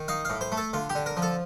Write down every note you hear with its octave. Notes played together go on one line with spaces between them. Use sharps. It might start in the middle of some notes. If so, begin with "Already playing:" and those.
Already playing: D#3
D#4 F5
A2 F5
C5
A3
A4
D3 F4
G4
D3
A#4
F3
A4